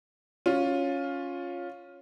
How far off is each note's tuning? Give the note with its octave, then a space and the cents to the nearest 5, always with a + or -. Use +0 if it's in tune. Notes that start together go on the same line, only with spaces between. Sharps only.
C#4 +0 F4 +10